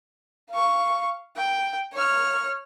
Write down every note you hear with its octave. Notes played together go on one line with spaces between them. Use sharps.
F5 C#6
G5
C#5 F6